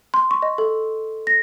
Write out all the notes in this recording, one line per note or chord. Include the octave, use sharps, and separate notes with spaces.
C6
C#6
D#5
A4
A#6